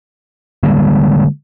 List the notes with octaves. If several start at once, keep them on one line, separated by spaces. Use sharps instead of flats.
D3 G3 G#3 A#3